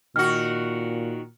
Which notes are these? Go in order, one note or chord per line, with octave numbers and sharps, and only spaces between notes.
A#2 D#3 F#4 F6